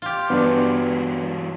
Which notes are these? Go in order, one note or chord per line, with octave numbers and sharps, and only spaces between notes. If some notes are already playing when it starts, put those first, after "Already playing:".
F4 G4
G2 E3 F#3 G#3 B3 D4